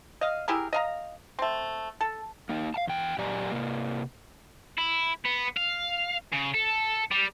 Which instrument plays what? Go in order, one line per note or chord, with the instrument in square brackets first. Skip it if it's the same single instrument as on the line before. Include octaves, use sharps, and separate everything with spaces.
[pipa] D#5 F5
E4 G4 G#4 A#4
D#5 F5 A#5
A3 C4
A4
[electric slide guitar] A#3 D#4
F5 A5
E2 G5
A#2 F#3 G4 D5 G#5 A#5
C3 A#3
[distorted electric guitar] E4
B3
F5
C#3
A4
G3